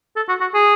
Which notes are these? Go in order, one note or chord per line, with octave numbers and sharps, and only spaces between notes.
A4
F#4
F#4
G#4